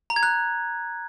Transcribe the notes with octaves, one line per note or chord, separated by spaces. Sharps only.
A#5
G#6
F#6